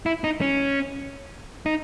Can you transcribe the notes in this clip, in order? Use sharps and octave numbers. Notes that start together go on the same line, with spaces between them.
E4
D#4
C#4
D#4